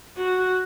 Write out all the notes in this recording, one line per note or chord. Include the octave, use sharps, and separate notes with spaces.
F#4